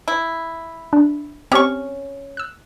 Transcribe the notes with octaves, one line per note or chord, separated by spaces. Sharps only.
E4
D4
C4 C#4 G4 C#5 C#6
E6 F#6